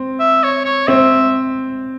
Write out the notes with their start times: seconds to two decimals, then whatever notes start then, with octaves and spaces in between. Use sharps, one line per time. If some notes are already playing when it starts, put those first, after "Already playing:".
Already playing: C4
0.20 E5
0.44 C#5
0.65 C#5
0.88 C4 E5